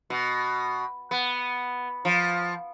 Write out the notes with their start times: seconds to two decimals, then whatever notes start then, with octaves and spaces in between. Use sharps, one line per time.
0.10 B2
1.11 B3
2.05 F3